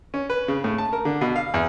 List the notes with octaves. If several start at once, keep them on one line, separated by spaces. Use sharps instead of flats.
C#4
B4
C#3
A2
A5
A#4
D3
B2
F5
E2